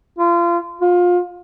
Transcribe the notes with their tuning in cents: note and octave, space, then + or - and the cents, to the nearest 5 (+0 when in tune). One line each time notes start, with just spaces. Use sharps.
F4 -30
F4 +25